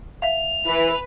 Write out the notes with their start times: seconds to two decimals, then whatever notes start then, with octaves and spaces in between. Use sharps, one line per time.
0.22 E5 F5 F7
0.66 E3 B4